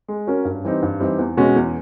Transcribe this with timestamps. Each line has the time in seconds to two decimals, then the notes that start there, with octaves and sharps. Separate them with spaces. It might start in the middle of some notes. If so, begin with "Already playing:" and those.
0.08 G#3
0.27 C#4 F#4 A#4 C#5
0.45 G2
0.65 E3 G3 C4 D#4
0.83 G2
1.00 E3 G3 C4 D#4
1.19 E2
1.37 B2 G#3 C#4 F#4
1.56 E2